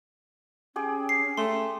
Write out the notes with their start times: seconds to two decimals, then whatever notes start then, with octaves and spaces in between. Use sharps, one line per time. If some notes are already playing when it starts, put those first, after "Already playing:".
0.76 C#4 G4 G#4 G5
1.09 C7
1.37 A3 C6